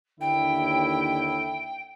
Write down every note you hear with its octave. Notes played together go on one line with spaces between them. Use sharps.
D#2 D3 E4 G5